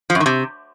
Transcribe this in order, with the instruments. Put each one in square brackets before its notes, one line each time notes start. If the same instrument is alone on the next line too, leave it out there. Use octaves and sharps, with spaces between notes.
[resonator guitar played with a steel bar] F3
F#2
D#3
C3